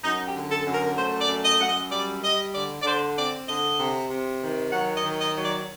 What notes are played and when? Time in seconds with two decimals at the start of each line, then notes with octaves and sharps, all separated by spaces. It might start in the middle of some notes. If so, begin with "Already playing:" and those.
0.02 F#2 D#4
0.27 G4
0.34 D3
0.50 A4
0.66 F#2
0.74 A#4
0.96 A3 C5
1.20 D5
1.29 F#2
1.44 D#5
1.60 F#2 F#5
1.67 D#5
1.90 G3 D5
2.22 G3 D#5
2.54 D3 D5
2.81 D5
2.84 D3 C5
3.16 C4 D5
3.47 D3 D#5
3.78 C3
4.10 C3
4.41 D#3
4.72 F#3 F#5
4.96 D#5
5.04 D#3
5.20 D#5
5.36 F#3
5.44 D5